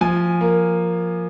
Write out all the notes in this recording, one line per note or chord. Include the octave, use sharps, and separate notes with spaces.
F3 G#5
A#3